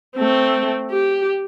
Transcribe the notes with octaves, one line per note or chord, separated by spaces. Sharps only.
A3 C4
G4